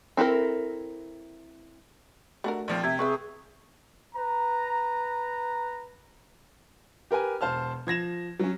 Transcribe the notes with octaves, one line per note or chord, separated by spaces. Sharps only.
C4 E4 A4 A#4
A3 D4 F#4 A#4
A#1 F3 C4
C3 E5 G#6
C4 G#4 B4 E5 C#6
B4 A#5
G4 A#4 B4 G#5
E1 C5 A5 F6
F3 G#6 A#6 E7
F#3 C#4